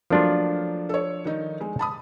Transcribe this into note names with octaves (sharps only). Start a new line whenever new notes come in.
F3 F#3 A3 A#3 D4 F4
A4 C#5
D#3 D#4
G#3
A5 B5 D#6